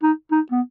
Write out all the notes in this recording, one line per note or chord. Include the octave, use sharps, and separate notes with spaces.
D#4
D#4
B3